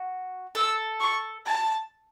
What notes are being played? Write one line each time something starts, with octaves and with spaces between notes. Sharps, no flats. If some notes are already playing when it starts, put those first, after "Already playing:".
Already playing: F#4
A4 E6
C#6
A5